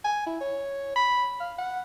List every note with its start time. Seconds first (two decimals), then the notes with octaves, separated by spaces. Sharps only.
0.05 G#5
0.26 E4
0.40 C#5
0.96 B5
1.40 F5
1.58 F#5